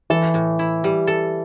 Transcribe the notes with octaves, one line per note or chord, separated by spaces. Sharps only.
E3 A4
A2
E4
G3
A4